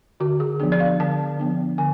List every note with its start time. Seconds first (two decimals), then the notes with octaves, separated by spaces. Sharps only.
0.20 D3 F#4
0.40 G#4
0.60 F3 B3 D4 G#4
0.72 D5
0.80 F5
1.00 D3 A5
1.40 F3 B3 D4
1.78 D3 G#5